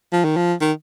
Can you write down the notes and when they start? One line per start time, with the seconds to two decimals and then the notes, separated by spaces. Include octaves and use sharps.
0.13 F3
0.24 D#3
0.36 F3
0.61 D#3